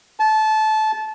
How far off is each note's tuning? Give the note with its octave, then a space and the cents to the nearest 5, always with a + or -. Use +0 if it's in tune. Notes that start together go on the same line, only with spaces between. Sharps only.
A5 -20